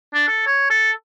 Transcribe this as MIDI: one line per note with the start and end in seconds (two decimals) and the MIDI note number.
0.14 0.24 62
0.28 0.44 69
0.47 0.68 73
0.70 0.91 69